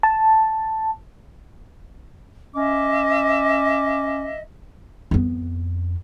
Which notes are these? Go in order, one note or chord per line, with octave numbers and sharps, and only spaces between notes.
A5
C#4 D#5 E5 D6
F2 B3